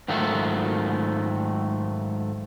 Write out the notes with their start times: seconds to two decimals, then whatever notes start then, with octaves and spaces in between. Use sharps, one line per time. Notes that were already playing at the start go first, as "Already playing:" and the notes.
0.08 G#2 D#3 F#3 A3 F4 F#4